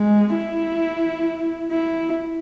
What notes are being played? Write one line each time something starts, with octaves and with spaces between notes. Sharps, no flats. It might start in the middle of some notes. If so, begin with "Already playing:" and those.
Already playing: G#3
E4
E4